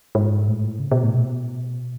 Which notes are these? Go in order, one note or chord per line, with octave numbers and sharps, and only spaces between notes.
G#2
A2
C#3
B2
A2
B2